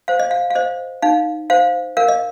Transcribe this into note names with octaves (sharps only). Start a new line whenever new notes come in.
C5 F5
D#5
F5
F5
C5 D#5
D#4 F5
C5 F5
A#4 F5
D#5